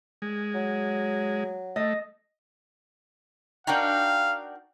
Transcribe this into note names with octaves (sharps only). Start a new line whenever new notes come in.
G#3
F#3
A3 D#5
D4 D#4 F#4 A#4 F5 G5